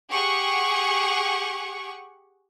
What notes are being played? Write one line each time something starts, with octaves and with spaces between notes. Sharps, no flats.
G4 G#4 F#5 C#6